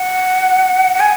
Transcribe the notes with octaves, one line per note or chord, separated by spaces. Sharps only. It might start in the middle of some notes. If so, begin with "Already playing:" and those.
Already playing: F#5
F#5
G#5